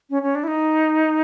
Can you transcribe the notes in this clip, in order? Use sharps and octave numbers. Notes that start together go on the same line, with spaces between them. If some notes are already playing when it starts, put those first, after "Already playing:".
C#4
C#4
D4
E4
D#4